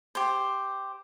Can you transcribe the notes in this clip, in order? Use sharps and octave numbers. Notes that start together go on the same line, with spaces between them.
G4 C5